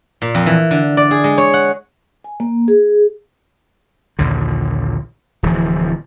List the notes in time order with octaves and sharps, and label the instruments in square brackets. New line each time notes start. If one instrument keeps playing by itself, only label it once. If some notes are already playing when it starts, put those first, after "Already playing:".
[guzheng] A#2
F2
E3
D3
D5
G#4
G#3
C#5
F#5
[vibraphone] G#5
A#3
G#4
[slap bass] A#1 D#2 D3
D1 E3 F3